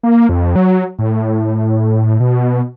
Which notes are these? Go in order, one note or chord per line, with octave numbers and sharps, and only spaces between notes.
A#3
F2
F#3
A2
B2